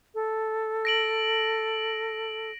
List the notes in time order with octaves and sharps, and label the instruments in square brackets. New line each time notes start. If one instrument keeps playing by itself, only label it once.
[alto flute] A4
[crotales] A#6 D7 F#7